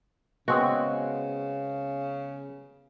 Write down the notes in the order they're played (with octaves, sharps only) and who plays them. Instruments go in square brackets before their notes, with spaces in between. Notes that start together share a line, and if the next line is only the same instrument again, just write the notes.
[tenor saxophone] C#3 [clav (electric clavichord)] G#3 C4 [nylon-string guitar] B3 [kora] F#4